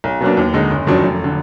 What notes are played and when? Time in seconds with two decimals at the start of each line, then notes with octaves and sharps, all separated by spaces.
0.04 B1
0.21 B2 F#3 A#3 D4
0.37 D#2
0.54 D3 G#3 D#4
0.70 F#1
0.87 F2 D#3 F#3 D4
1.03 F1
1.24 D3